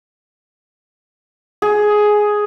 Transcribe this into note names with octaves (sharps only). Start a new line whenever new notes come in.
G#4